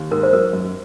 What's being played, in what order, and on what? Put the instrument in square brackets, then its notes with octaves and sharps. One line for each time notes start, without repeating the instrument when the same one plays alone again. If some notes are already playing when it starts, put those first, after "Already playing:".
Already playing: [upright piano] D#2
[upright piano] G#2 [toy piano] A#4
[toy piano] C5
[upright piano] F#3 [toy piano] A#4
[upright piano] F#2